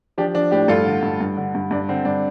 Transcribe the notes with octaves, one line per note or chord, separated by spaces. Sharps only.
F3 D4 G4
F3 D4
A2 D4 G4
G2 F4 A4
D3
G2
G2
D3
G2
G2 D4
D3 C4
G2 D4